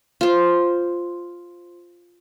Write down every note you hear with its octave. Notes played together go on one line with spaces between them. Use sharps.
F4 C5